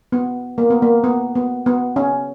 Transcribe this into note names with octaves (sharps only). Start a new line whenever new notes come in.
B3
A#3
B3
A#3
B3
B3
B3
C#4